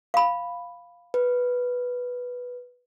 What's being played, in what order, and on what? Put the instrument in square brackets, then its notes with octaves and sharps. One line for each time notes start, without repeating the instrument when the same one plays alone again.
[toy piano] F5 B5
[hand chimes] B4